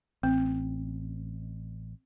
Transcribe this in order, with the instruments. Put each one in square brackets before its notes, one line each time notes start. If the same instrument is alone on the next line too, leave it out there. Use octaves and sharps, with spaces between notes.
[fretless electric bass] A1 [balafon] C4